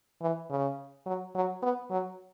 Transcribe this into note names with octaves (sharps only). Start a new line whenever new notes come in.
E3
C#3
F#3
F#3
B3
F#3